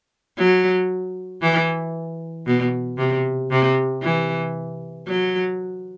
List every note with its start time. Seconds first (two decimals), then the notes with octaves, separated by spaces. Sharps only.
0.37 F#3
1.42 E3
2.47 B2
2.98 C3
3.51 C3
4.02 E3
5.07 F#3